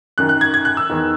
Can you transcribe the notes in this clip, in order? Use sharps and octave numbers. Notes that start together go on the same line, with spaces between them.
F#2 D#3 F#6
F#6
G#6
G#6
F#6
E6
E2 D#3